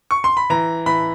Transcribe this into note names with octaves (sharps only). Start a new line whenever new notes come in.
C#6
C6
B5
E3 A#5
E3 B5